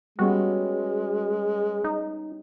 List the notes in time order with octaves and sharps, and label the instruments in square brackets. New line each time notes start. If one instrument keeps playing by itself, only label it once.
[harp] G3 B3 C#4 [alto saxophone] G#3 [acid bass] F#4
[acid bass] D#4